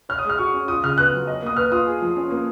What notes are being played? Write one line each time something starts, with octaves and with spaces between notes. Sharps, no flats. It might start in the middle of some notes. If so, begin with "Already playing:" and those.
C#5 F6
D#6
G#3
F6
F#4 C#6
C#4
F4 D#6
C#3 F6
B3 F#6
F#3
D#5
A#3 D#6
B4 F6
F4 D#6
G#4
F3
C#4
A#3